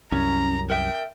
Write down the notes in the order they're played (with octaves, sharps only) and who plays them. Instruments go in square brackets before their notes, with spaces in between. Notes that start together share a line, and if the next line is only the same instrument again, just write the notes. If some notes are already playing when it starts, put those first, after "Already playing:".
[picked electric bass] C2 F#2 [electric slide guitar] C#4 [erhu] A#5
[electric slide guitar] A#4 E5 [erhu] G5